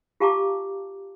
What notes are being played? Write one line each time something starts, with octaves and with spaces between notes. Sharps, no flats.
F4 G4 F5 A5 A#5 D6